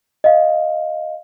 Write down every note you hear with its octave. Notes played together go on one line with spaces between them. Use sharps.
D#5 F5